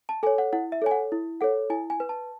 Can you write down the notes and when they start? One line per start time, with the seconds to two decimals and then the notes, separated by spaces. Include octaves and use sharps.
0.09 A5
0.23 A4 G#5
0.27 C#5
0.38 F#5
0.53 E4 F#5
0.72 E5
0.82 A4 C#5 G#5
0.91 F#5
1.12 E4
1.41 A4 C#5 F#5
1.70 E4 G#5
1.90 G#5
2.00 B4
2.09 A5